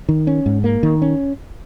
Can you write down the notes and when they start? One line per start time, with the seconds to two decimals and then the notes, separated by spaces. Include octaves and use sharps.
0.09 D#3
0.27 C#4
0.46 G#2
0.64 A#3
0.83 D#3
1.02 C#4